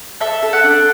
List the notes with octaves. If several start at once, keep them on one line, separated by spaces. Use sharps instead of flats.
A4 E5
A4
F#5
D4